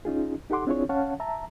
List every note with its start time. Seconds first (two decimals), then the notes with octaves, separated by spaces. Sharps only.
0.05 C#4 D#4 F4 G#4
0.50 D#4 G4 A4 F#5 C6 D6
0.67 C4 D4 E4 F4 G#4 C#5
0.89 C#4 C#5 F5 F#5 A5
1.20 E5 A5 A#5